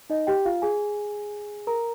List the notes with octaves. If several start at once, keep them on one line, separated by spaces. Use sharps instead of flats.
D#4 D#5
G4 G5
F4 F5
G#4 G#5
A#4 A#5